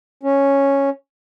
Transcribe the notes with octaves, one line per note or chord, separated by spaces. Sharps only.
C#4